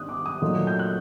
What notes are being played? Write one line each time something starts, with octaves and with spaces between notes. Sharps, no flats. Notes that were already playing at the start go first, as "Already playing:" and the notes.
Already playing: D#3 G3 D4 D#6 F#6
D6
D#6
A#2 F#3 A3 D#4
G6
F#6